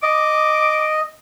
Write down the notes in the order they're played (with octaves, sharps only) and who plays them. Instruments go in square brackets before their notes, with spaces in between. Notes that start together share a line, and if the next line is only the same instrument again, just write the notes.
[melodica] D#5 [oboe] D6